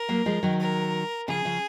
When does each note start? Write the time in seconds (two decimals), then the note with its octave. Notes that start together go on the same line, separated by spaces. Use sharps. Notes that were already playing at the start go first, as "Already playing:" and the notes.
Already playing: A#4
0.09 F#3 A#3
0.26 F3 G#3
0.43 D#3 F#3
0.60 A#4
1.28 C#3 F3 G#4
1.45 C#3 F3